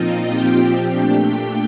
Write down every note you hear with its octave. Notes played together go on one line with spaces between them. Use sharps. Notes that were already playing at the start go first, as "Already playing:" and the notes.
Already playing: A#2 F3 C4 D#4 F4 D#5
G4 G5
A#2 A3 D4